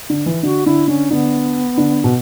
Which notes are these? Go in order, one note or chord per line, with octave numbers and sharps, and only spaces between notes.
D3
E3
D3 F#4
D3 E4
D3 C#4
D3 B3
D3
B2